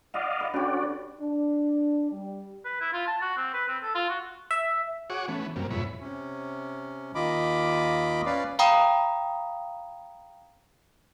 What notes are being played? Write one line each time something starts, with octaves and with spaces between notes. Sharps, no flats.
D5 D#5 F5 F#5 C6
B4
D3 C#4 F#4 G4 D5
D4
G3
B4
E4
F4
A5
F#4
C4
B4
C4
A4
F4
F#4
E5
F#4 G#4 C#5 F#5 C#6 D6
E3 A3 B3 C#4
F#2 C3 G3 A#3
F2 G#2 B2 E4 C#5 B5
C3 C#4
D#2 D#3 F4 D#5 B5 D6
C#4 B4 D5 F5
F5 G5 A#5 B5 D#6